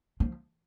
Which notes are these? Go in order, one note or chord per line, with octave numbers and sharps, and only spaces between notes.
F3